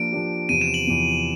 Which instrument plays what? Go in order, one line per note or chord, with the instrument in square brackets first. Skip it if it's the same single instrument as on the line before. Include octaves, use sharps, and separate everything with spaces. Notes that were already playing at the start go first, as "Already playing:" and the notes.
Already playing: [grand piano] F3 A#3 D4 G4 [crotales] D7
[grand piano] F3 A#3 D4 G4
[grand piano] E2 C3 F3 [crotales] D#7
[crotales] E7
F#7
[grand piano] E2 C3 F3